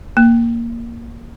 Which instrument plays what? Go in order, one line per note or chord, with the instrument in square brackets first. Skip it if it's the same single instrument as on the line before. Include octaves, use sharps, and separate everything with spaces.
[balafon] A#3